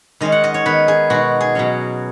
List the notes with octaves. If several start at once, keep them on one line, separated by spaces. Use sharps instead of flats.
D#3 G#3 C#4 D#5
F#5
D#5
C#5
D#3 B3 D#4 B4
G#4
B2 G#3 D#4 F#4
G#4
B2 F#3 C#4